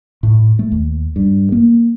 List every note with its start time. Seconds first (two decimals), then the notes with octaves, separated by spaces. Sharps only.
0.23 A2
0.59 A3
0.72 D#2
1.16 G2
1.52 A#3